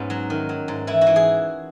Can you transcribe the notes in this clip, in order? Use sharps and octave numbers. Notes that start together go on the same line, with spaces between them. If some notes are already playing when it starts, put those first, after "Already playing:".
Already playing: G#2 B3 C#4
F#3
D#3
F#3
G#2
E3 E4
F#4
E3
G#4